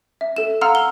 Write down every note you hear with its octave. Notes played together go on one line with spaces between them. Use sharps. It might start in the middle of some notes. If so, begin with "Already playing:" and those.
E5
A4 E7
F5 F#5 A#5 C6 E6 F6
G7